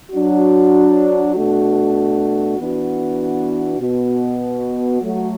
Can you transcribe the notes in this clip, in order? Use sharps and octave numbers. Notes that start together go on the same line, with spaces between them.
F#3 D4 F#4
B2 A3 D4 F#4
E3 B3 D4 F#4
B2 B3 F#4
F#3 A3 F#4